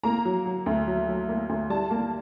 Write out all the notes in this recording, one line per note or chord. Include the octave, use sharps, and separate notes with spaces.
A#3 A#5
F#3
F#3
D2
F#3
F#3
A#3
D2
G3 A5
A#3